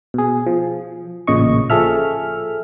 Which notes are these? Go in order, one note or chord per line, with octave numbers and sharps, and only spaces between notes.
B2 G#4
F3
A1 A#2 C#3 D#5 C#6
F3 G#4 A4 E5 F6